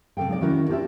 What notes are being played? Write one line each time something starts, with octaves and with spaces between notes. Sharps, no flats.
C3 F#3 A4 F5 G5
G#3 D#4 D5
D#3 C#4 E4 F#4 A#4
D4 F4 G4 C5 D5 E5